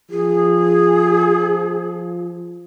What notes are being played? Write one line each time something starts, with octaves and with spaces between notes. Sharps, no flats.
F3 G#4